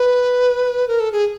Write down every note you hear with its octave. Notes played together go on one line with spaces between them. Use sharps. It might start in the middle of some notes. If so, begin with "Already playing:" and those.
Already playing: B4
A#4
A4
G#4